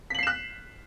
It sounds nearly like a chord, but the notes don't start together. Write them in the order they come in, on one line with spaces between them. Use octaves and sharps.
B6 F#7 C7 E7 F#6